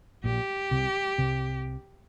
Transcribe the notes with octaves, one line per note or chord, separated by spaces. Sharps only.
A#1 A#2 G4
C2 C3
C2 C3